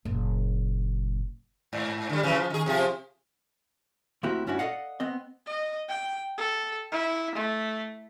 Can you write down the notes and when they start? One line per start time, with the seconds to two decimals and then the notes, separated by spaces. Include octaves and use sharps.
0.05 F#1 A#2
1.73 G#2
2.09 D3 G3
2.23 C#3 E3 F#3
2.37 F3
2.50 D#3 G#4
2.66 C3 F3 G#4
4.23 D2 A#3 C4 E4 F#4 G4
4.47 G2 C#4 D4 E4 F#4
4.59 A4 D5 D#5 F5 F#5
5.00 B3 C4 D#5
5.46 D#5
5.89 G5
6.37 A4
6.92 E4
7.35 A3